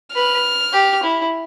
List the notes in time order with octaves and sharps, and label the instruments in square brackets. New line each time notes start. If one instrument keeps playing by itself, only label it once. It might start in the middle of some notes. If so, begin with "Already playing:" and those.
[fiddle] B4 [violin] F6
[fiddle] G4
E4